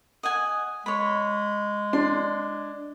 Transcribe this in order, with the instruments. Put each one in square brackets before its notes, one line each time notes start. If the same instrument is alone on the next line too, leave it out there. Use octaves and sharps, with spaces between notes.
[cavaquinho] D#5 F#5 G#5
[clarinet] G#3 [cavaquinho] C#5 B5
[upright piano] D4 [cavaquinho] C6